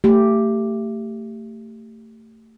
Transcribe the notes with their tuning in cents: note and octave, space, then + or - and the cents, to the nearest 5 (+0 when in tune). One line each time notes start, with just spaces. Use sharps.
A3 +25 G4 +0